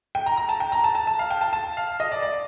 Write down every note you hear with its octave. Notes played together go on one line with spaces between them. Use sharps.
G5
A#5
A#5
A5
G5
A#5
A5
A5
A5
F5
G5
A5
A5
F5
D#5
D5
D5